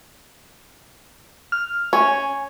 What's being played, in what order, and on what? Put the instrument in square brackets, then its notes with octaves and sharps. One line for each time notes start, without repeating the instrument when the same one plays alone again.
[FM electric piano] F6
[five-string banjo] C#4 [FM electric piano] G#5